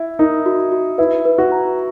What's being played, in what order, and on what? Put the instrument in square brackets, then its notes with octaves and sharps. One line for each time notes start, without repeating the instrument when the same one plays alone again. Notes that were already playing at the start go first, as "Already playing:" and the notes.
Already playing: [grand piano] E4 [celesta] E5
[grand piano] D#4 [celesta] A#4
[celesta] F#4
F#4
[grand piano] E4 [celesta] B4
[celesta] B4
[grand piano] F#4
[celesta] A#5